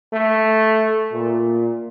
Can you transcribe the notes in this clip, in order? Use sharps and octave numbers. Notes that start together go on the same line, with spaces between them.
A3
A#2